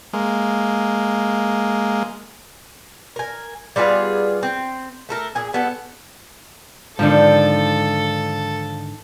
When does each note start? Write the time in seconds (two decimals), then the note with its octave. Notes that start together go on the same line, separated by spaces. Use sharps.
0.13 G#3 A#3
3.16 A#4 G#5
3.76 G3 B3 F4 G#4
4.43 C4
5.09 A3 A4 A#4
5.35 A#2 G#4 G#5
5.53 G3 B3 A4
6.99 G#2 D3 D#3 F3 D4 A4